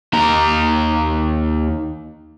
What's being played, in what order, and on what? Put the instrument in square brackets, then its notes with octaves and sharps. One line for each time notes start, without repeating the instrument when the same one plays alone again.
[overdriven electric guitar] D#2 A#4